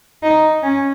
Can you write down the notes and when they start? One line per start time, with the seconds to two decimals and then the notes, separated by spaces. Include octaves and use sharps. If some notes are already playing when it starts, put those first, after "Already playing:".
0.23 D#4
0.63 C#4